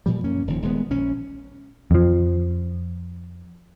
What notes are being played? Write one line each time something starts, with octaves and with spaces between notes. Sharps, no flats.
A#2 F3 G3
F#2 A#3 C#4
D#1 D#3 F3
D#1 G#3 B3
A#1 C#4
F2 F3